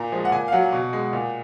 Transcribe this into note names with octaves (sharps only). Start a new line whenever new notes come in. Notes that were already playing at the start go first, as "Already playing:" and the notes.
Already playing: A#2 A#5
F3 G#3
F#5
A#2 G#5
F5
F#3 F#5
B2
G#3
A#2